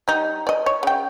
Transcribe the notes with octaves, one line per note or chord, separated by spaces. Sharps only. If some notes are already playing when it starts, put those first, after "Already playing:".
G3 D#4
D5 D#5
C#5
C#3 G5